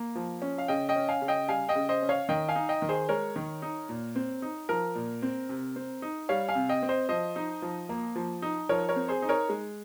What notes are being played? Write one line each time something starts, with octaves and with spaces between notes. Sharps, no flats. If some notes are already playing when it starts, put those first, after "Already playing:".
Already playing: A#3
F3
C#4
F5
C#3 D#5 G5
D#5 G5
C#4
F5 G#5
C#3
D#5 G5
G3 F5 G#5
D#5 G5
C#3
C5 D#5
C#4
C#5 F5
D#3 D#5 G5
F5 G#5
D#4
D#5 G5
D#3
G#4 C5
G#3 A#4 C#5
D#3
D#4
A#2
C4
D#4
F3 A#4
A#2
C4
C3
C4
D#4
G3 C#5 F5
F5 G#5
C3
D#5 G5
C4
C5 D#5
F3 C5 D#5
D#4
F3
A#3
F3
D#4
F3 A#4 C#5
A#4 C#5
C4
G#4 C5
D#4
A#4 C#5
G#3